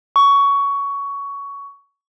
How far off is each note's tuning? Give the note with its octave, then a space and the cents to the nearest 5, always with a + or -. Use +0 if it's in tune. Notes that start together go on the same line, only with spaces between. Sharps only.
C#6 +15